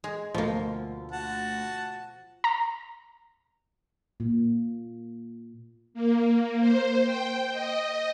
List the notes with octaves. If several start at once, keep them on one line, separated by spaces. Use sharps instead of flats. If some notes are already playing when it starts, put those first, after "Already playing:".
G#3
D2 B2 F3 A#3
F#4 F#5 A5
A#5
A#2
A#3
C5
G5
D#5